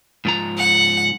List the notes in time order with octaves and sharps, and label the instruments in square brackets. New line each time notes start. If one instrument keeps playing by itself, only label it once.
[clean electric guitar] G#2 F3 A#5
[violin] F#5